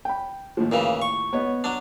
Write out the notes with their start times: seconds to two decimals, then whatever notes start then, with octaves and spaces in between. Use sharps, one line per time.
0.05 G5 B5
0.57 D#2 A2 F3
0.72 A#2 C#3 E3
1.02 C#6
1.33 B3 C#5 D#5
1.64 F#3 D4